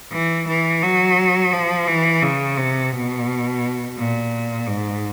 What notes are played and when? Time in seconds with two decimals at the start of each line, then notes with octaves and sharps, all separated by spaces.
0.12 E3
0.48 E3
0.82 F#3
1.52 F3
1.87 E3
2.22 C#3
2.57 C3
2.93 B2
3.97 A#2
4.67 G#2